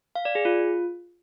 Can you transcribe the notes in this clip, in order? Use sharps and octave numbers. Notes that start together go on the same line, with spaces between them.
F5
D5
G#4
F4